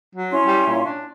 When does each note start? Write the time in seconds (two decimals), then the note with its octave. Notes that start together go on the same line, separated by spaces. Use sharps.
0.15 F#3
0.31 C#4 E4 C6
0.47 G3
0.67 A#2
0.86 D4